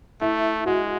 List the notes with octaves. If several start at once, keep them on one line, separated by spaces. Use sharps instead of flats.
A3 E4
G#3 F#4